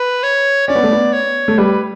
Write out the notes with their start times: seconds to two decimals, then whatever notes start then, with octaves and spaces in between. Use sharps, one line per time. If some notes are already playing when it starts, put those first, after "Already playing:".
Already playing: B4
0.23 C#5
0.68 C#4 D5
0.75 B3
0.83 A3
0.91 B3
1.13 C#5
1.48 A3
1.58 G3 B4